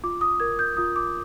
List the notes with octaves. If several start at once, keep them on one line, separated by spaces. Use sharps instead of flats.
F4 D6
D#6
A#4 G#6
G6
F4 D#6
D6